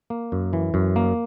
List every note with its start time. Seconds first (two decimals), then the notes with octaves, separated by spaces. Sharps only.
0.10 A#3
0.32 F#2
0.53 E3
0.74 F#2
0.96 A#3